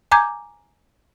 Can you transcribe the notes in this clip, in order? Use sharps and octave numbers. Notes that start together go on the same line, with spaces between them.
G#5 A#5 D6 G6 G#6